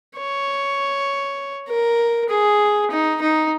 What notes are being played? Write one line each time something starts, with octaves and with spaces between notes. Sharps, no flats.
C#5
A#4
G#4
D#4
D#4